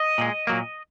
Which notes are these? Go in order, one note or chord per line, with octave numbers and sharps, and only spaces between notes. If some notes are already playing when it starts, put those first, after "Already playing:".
Already playing: D#5
A#2 G#3
A#2 F#3 A#3